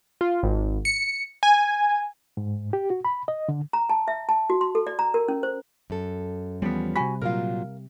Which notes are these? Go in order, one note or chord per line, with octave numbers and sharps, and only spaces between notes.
F4
G#1
C#7
G#5
G#2
G4
F#4
B5
D#5
D3
A#5
A5
E5
A5
F#4
C6
A4
D5
A#5
A#4
C#4
C5
F#2 A4
E2 F3 G3 B3 C#4
C3 F#4 G#5 B5
A#2 F#3 F4 A#4 F5